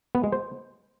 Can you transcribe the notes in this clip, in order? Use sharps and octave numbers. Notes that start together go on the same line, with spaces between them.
B3
G#3
C5